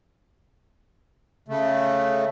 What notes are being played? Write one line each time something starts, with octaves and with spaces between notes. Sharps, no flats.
C#3 A3